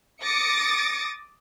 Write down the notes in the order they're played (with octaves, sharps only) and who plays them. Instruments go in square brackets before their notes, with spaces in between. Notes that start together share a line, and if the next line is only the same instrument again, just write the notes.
[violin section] D6 D#6 A6 A#6 C#7 D7